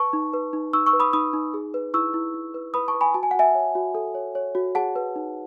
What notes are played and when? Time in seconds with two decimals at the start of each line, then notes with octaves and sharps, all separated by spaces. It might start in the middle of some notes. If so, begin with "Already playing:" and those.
Already playing: B4 A5 C#6
0.13 D#4
0.33 B4
0.53 D#4
0.73 D#4 C#6 E6
0.86 C#6 E6
0.93 B4
1.00 B5 D#6
1.13 D#4 B5 D#6
1.33 D#4
1.54 G#4
1.74 B4
1.94 E4 C#6 E6
2.14 E4
2.34 E4
2.54 B4
2.74 B4 B5 D#6
2.88 A5 C#6
2.94 B4
3.01 G#5 B5
3.14 F#4 A5
3.23 G#5
3.31 F#5
3.35 F#4 E5 G#5
3.55 C#5
3.75 F#4
3.95 A4
4.15 C#5
4.35 C#5
4.55 F#4
4.75 G#4 F#5 A5
4.96 B4
5.16 D#4